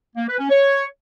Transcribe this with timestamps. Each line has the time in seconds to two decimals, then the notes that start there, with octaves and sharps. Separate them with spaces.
0.16 A#3
0.27 B4
0.38 C#4
0.49 C#5